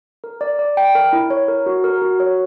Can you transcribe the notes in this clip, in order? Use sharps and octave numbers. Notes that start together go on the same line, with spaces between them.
A#4
D5
D5
G5
A#4
E4
C#5
A#4
F#4
A#4
F#4
C#5